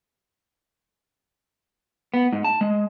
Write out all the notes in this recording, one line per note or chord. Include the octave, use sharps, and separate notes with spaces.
B3
G#2
A5
G#3